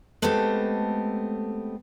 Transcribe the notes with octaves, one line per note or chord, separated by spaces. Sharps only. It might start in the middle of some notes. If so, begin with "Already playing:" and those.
G#3 A3 B3 C4 G4 A4